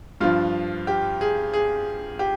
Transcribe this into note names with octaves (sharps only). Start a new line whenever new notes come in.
G2 F3 F4
G4
G#4
G#4
G4